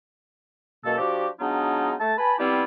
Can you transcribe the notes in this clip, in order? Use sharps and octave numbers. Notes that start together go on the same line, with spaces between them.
C#2 F#2 B2 A#3 A4
F3 D4 F#4 G4
F#3 G#3 B3 D4 D#4 F4
A3 A5
B4 G#5 A5 B5
G3 B3 C4 E4 F4 G4